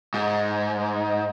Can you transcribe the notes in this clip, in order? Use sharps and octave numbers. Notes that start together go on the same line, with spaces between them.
G#2